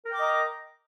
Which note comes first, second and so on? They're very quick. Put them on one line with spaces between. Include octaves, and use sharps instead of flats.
A#4 G5 D6 D#5 A#5